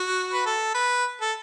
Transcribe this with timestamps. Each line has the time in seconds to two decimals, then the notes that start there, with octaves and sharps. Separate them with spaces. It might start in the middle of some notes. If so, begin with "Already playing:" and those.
Already playing: F#4
0.33 B4
0.46 A4
0.74 B4
1.21 A4